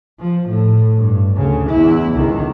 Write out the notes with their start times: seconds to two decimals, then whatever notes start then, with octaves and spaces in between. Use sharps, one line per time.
0.19 F3
0.48 A2
0.97 G2
1.36 D2 C#3
1.70 E2 E4
2.16 C#2 D#3